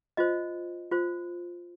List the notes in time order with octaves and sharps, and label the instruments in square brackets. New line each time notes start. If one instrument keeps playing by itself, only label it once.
[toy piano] F4 C5 D#5
F4 C5